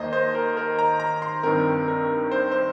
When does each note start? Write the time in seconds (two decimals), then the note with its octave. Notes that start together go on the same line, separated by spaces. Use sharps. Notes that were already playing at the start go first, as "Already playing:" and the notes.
Already playing: D#2 D#3 A#3 C5 D#5
0.13 C5
0.35 A#4
0.57 A#4
0.79 A#5
1.00 A#5
1.22 C6
1.43 G2 D#3 C4 A#4
1.88 A#4
2.32 C5
2.52 C5